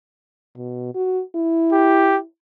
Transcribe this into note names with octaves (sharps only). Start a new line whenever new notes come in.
B2
F#4
E4
G4